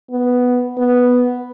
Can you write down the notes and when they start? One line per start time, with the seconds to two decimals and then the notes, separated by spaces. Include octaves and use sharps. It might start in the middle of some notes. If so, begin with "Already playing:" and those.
0.11 B3
0.78 B3